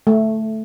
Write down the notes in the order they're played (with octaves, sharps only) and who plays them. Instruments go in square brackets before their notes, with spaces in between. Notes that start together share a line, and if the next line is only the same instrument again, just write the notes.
[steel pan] A3